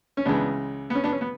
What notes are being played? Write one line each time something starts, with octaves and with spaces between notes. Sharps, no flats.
C#4
C#2 C#3 E3 G#3 B3 D4
B3
C#4
B3 D4
C#4
B3